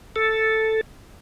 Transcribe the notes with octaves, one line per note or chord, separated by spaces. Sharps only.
A4